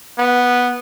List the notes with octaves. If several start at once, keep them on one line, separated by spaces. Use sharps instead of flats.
B3